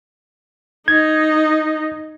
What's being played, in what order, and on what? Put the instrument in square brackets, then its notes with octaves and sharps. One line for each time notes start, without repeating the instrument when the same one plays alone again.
[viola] D#4 [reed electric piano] G#6